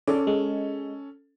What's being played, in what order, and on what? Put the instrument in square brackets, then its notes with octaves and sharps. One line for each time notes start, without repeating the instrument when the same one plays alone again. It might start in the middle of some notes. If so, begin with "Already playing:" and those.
[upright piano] C#4 A4 [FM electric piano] D5
[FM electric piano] G#3